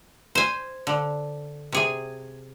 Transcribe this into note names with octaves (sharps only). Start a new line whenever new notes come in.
C5 G#5
D3
C3 G#4 G#5